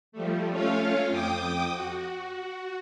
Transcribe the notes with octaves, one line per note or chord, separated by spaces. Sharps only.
F3 G3 A3
A3 C#4 F4 C#5 F5
F2 G5 D6 D#6
F#4